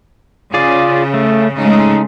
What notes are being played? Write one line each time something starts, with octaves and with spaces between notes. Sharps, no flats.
C#3 F4 G#4 D5
A3
C#3 G#3 A3 D#4